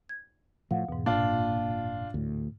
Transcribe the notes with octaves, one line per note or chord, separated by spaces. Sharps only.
G#6
A2 F3 F5 F#5
E2 G#2 B2
F#1 A#2 A#3 D4 F4
D2 A2